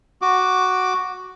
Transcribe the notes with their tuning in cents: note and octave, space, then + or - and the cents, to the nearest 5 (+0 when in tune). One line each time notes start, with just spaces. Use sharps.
F#4 +0 D6 +0